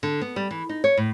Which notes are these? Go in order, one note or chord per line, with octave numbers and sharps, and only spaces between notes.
D3
B3
G3
E3
D#4
C#5
A2